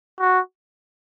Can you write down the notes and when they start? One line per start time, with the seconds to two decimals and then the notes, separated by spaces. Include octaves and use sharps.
0.20 F#4